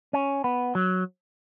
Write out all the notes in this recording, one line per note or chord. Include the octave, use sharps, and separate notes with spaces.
C#4
B3
F#3